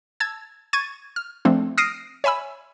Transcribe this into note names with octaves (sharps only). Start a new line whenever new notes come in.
A5 E6 G#6 A6
C#6 G#6 A6 D#7
F6
F3 A3 C4 D4
D#6 F6 A#6 C7 D7 D#7
C#5 E5 G#5 B5 E6